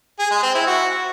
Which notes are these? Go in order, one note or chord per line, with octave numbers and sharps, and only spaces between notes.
G#4
G#3
C4
E4
F#4